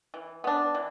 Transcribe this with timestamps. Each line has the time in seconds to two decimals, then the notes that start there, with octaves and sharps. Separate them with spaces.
0.14 E3
0.44 B3 D4
0.75 E3